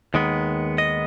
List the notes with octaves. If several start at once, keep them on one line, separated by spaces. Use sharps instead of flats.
D#2 D#3 G#3 B3
D#5